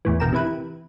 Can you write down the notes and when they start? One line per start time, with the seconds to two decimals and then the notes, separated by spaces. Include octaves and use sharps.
0.05 E2 A2 E3
0.20 G1 B2 A#4 G5 A#5 E7
0.33 C3 E3 E4 B4